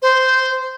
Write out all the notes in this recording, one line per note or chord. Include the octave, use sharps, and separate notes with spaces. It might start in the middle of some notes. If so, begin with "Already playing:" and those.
C5